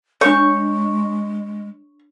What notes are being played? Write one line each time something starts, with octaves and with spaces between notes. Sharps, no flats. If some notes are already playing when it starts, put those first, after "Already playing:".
G#3 D4 C#5 C#6